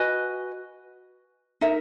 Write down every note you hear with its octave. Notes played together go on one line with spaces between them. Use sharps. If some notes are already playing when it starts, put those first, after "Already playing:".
Already playing: F#4 B4 D#5 G#5
D#4 A#4 E5